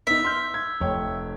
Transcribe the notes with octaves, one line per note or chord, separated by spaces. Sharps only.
B3 D#4 E5
C6 F6 G6
G#6
F1 C#5 G5